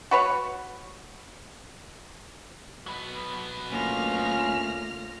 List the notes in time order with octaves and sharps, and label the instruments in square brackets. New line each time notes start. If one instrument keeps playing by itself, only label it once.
[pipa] F#4 B4 C#5
[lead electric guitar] F#3 B3
[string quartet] D2 F6 A#6 [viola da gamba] A#3 F4 [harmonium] C#4